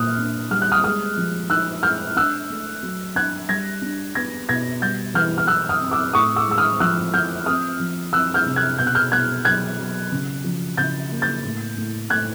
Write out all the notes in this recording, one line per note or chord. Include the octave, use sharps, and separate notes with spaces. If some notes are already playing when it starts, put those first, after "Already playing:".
Already playing: A#2 A#3 D#6 F6 F#6
D4
G3 F6
F#6
D#6 F6
G#3 D#6 F6
F3
D#4 E6 F#6
G#3 F6 G6
D4 E6 F#6
A3
F#3
D4 F#6 G#6
G3 G#6 A#6
D4
B3 G#6 A#6
B2 G#6 A#6
G3 G6 A6
E3 F6 G6
F6
E3 E6 F#6
D#6 F6
C4
D6 E6
A2 C#6 D#6
D6 E6
G#3 E6
D#6 F6
F3 E6 F#6
F3 F6 G6
C4 D#6 F6
F3
C4 E6 F#6
F6 G6
C3
F#6 G#6
B2 G6
F#6
F6 G6
B2 F#6 G#6
F#3 F#6 G#6
F#3
C#3
F3
C#3 G6 A6
A#3
G6 A6
A2
A2
A2 F#6 G#6